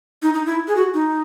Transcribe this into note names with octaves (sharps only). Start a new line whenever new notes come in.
D#4
D#4
E4
G#4
F#4
D#4